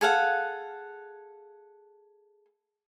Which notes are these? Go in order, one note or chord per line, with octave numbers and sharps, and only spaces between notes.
G#4 A4 F5 F#5